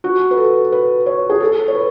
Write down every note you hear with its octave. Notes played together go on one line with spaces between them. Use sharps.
F#4
B4
A4
B4
C#5
G#4
A4
C#5
B4